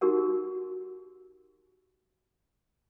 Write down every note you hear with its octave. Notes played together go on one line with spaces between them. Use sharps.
D#4 F#4 G4 A#4 F#5